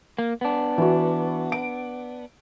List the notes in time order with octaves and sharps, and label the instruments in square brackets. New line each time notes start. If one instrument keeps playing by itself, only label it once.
[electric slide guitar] A#3
B3 D4
[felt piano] E3 F#4
D7